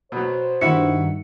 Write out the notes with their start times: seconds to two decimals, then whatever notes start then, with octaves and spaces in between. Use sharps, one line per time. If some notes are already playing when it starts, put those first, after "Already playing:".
0.12 B2 F#3 C5
0.61 G2 D#3 E4 F#4 E5 C#7